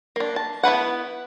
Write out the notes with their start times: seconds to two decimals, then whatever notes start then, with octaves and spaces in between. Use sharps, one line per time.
0.16 A#3 D4
0.36 A5
0.63 B3 E4 B4 F#5